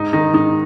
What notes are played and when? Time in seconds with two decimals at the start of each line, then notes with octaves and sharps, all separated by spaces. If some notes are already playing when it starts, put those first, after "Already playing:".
Already playing: G#2 D#4
0.13 D#3 D#4
0.33 G#2 D#4